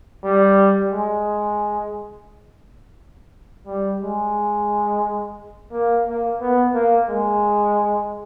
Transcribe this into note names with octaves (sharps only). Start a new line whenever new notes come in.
G3
G#3
G3
G#3
A#3
A#3
B3
A#3
G#3